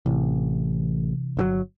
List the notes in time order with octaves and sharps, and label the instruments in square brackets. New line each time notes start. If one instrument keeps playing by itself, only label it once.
[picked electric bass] A1 [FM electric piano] C3 E3
[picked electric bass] G1 D3 F#3